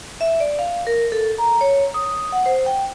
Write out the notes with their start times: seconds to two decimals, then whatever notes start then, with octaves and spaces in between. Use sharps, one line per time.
0.21 E5
0.40 D5
0.59 F5
0.87 A#4
1.12 A4
1.38 A#5
1.61 C#5
1.94 D#6
2.32 F#5
2.46 C5
2.66 G5